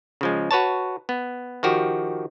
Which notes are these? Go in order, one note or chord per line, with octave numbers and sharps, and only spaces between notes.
C#3 F3 G#3
F#4 B4 C#5 A5
B3
D#3 F3 F#4 G4